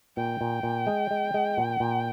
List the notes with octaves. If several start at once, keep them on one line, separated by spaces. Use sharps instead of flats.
A#2 G5
A#2
A#2
G#3
G#3
G#3
A#2
A#2